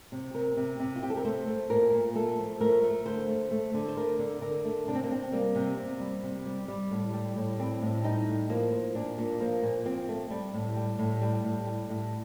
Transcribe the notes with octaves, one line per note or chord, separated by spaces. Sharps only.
C3
C3 A#4
C3
C3
F4
C3 G4
A4
A#4
A3 C5
A3
A#2 A#4
A#2
A3 A4
F3
A3 A#4
A3
D3 C5
A3
A3
D3
C5
A3 A#4
D3
D3 A#4
A3
C3 D4
C4
A#3
C3 C4
G3 A#3
C3
C3
G3
C3
G3
G3
A2
G3
A2
G3 C4
A2
G3 D#4
A2
F3 A#3
F3
A#2 D4
A#2
F3 A#3
A#2
F3 C4
A3
G3
A2
G3
A2
G3
A2
G3
A2